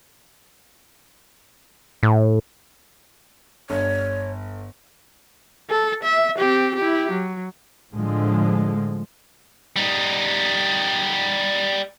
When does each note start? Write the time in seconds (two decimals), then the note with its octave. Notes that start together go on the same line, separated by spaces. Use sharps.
2.03 A2
3.70 G1 C#5
5.70 A4
6.04 E5
6.38 C4 G4
6.76 E4 G4
7.11 F#3
7.93 A2 D3 F3 G#3
9.76 G3 D#4